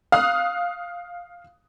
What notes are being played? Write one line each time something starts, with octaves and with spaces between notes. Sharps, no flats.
F5 D#6 F#6